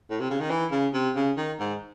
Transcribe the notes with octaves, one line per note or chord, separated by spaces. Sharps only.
A2
C3
C#3
D#3
E3
C#3
C3
C#3
D#3
G#2